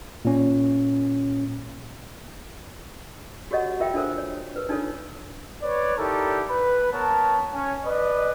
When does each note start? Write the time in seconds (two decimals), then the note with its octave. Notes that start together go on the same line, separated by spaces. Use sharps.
0.25 A#2 C#4
3.51 F#4 G4 A4 C#5 D#5 F#5
3.80 F4 A#4 E5 G5
3.94 D4 F4 A4 A#4 C5
4.18 C#5
4.56 A#4 B4
4.69 D4 D#4 F4 A4 A#4 C#5
5.63 B4 C#5 D5
5.98 D#4 E4 G4 A4 A#4 D5
6.50 B4 B5
6.92 B3 A#4 C#5 A5
7.54 C#4 C#5 G#5
7.85 B4 D5 D#5